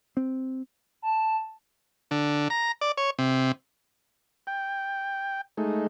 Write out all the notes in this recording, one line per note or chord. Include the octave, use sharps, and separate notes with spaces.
C4
A5
D3
A#5
D5
C#5
C3
G5
G#3 A3 D#4